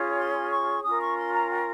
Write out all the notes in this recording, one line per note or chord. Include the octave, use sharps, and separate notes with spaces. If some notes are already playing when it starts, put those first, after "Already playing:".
Already playing: C#4 F4 G#4 C#5
C6
C#6
C#4 F4 A#4 D#6
C#6
C6
A#5
G5